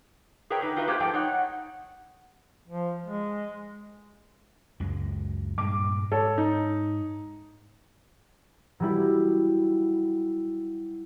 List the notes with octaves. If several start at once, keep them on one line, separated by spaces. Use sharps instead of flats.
G#4 A#4 B4 C#5 E5 G5
D3 D#4 B4
D#4 F4 F#4 B4 D#5 E5
A#3 F4 G4 G#4 B4 C5
G#2 F3 A3 G5
D#4 C#5 F#5
F3
G#3
C#2 F#2 G#3
G2 A#2 G#3 D6
G#2 A4 C#5
D#4
F#3 G3 E4